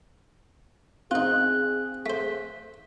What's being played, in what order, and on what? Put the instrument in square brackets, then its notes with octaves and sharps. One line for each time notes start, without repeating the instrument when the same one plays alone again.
[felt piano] C4 [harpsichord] D#4 F4 [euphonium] G#4 [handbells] F#6
[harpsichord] A3 C5 [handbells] B6